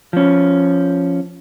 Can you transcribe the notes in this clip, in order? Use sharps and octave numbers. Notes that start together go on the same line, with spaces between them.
F3 C#4